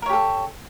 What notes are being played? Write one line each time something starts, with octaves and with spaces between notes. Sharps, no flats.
G4 A4 A#4 C#5